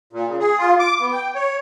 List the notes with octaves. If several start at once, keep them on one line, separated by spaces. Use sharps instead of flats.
A#2
C#3
G#4
F4
D6
B3
G5
C#5